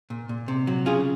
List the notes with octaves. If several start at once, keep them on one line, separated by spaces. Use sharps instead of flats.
A#2
A#2
C3
F#3
C#3 F4 G#4